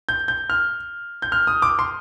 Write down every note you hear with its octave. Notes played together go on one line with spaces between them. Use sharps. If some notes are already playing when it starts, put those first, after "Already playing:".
G6
G6
F6
G6
F6
D#6
D6
C6